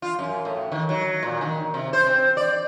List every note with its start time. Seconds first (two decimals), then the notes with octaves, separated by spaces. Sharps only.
0.02 F4
0.19 F#2
0.45 A2
0.72 D#3
0.89 F#3
1.23 A#2
1.41 D#3
1.74 C3
1.93 C5
2.06 C4
2.37 D5